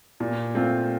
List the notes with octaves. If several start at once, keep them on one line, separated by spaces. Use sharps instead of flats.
A#2
A3 C4 F4